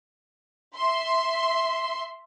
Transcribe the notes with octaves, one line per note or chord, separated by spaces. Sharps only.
E5 C6